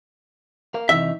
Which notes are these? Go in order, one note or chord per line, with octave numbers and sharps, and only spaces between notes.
A#4 F5
C3 E3 D#4 E5